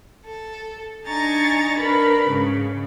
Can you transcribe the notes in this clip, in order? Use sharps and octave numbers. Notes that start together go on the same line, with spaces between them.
A4
D4 D#4 G#5 A#5 C#6 A6
D4 A#4 B4 B5
G#2 C#3